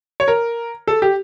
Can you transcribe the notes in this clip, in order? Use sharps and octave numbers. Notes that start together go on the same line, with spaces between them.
C#5
A#4
A4
G4